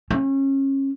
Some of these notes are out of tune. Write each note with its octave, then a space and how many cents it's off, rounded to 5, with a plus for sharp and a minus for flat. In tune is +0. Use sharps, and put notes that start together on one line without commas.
C#4 -30